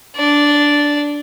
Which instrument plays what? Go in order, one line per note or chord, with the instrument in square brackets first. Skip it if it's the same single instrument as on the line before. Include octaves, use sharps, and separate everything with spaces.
[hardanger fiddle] D4 D5